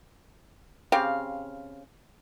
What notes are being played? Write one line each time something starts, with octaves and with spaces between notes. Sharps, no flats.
C#3 C4 G4 F5